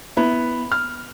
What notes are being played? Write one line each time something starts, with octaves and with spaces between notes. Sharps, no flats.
B3 E4
F6